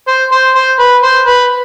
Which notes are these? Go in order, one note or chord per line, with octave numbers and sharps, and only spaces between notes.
C5
C5
C5
B4
C5
B4